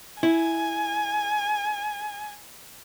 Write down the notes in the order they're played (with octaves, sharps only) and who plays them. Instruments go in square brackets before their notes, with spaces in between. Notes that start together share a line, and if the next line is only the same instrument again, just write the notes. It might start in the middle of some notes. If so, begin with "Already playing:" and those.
[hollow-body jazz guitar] E4 [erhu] G#5